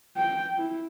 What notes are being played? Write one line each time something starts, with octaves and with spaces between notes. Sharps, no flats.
G5
E4